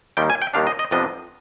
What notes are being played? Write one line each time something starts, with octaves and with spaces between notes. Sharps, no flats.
D#2 D#3 G3 G5
G#5
G5
D#2 D#3 G3 D4 F5
D#5
D#5
F2 C3 F3 B3 D4 D#5